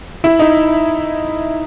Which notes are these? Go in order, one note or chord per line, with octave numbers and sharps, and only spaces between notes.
E4
D#4